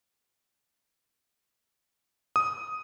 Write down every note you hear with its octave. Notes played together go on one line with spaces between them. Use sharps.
D#6